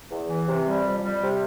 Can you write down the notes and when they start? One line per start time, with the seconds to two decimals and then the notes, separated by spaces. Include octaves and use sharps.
0.10 E2
0.29 E3
0.48 C3
0.66 G3
0.85 F2
1.03 G3
1.22 C3